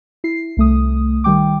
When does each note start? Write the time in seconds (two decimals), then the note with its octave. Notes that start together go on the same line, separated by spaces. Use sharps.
0.24 E4 C7
0.57 C2 A3 D#6
1.24 D#3 G3 G5 D6